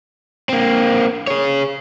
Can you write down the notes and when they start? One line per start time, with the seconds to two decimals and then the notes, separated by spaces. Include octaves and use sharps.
0.49 A#3 C4
1.27 G#4 C#5